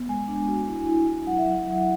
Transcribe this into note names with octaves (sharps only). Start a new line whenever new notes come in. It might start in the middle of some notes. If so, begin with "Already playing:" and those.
Already playing: B3
G#3 G#5
D4
F#4
E4
E4
E4
F#3 F#5
E5
F#3 F#5
F#3